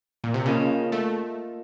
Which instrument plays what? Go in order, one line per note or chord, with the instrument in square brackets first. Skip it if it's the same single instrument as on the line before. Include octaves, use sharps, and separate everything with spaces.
[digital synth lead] A#2
C3
[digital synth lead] C#3 [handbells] A#3 F4 A#4 D#5 A5
[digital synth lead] A3